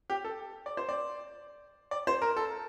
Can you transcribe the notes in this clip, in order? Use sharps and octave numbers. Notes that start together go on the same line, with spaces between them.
G4
A4
D5
C5
D5
D5
C5
A#4
A4